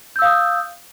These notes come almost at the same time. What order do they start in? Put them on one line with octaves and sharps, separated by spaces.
G6 E6 F5 D#6